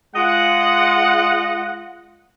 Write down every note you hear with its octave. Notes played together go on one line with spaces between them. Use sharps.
G#3 F4 D#5 F#5